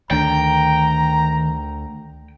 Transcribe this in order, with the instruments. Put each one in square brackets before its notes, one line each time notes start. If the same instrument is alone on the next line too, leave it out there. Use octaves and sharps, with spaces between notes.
[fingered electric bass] D2 D3 [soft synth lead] D#3 [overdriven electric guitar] G5 [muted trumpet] A#5